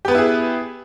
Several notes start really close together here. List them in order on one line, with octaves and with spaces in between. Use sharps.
G4 B3 B4 E4 G#4